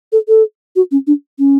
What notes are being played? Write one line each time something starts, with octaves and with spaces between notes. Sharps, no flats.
A4
A4
F#4
C#4
D4
C#4